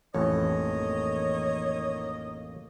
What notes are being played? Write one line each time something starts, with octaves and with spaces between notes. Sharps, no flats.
A1 F2 A2 D#3 A#3 C#5 D#5